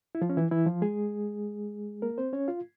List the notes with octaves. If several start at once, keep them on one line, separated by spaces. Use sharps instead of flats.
E4
F3 F4
C#4
E3 E4
E3 E4
F3 F4
G#3 G#4
A#3 A#4
C4 C5
C#4 C#5
F4 F5